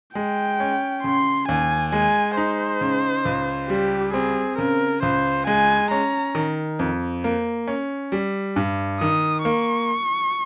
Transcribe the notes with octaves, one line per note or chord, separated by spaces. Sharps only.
G#3 G5
C#4
C#3 C6
D#2 G#5
G#3 G#5
D#4 C5
C#3
C#2
G3 G4
C4 G#4
C#3 A#4
C#2 C5
G#3 G#5
C#4 A#5
D#3
F2
A#3
C#4
G3
G2
D#3 D#6
A#3 C#6